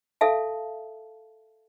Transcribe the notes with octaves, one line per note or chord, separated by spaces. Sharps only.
A4 E5 F5 A5